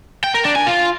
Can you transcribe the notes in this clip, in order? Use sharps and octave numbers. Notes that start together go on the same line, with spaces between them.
G5
A#4
D4
G#5
F4